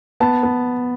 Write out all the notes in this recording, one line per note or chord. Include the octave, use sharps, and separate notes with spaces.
B3 A5
B3